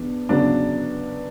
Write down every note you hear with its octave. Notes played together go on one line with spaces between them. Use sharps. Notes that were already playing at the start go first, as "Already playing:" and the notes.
Already playing: E2 B3 D4
C#3 F#3 B3 D4